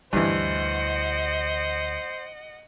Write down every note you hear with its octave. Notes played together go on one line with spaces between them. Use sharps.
D2 G2 E3 C5 D#5 F#5